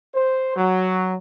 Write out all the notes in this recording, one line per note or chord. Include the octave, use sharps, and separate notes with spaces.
C5
F#3